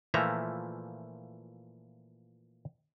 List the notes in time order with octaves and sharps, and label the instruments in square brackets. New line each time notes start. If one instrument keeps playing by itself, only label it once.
[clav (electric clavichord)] A#2 E3 F3 A3 E5 A#5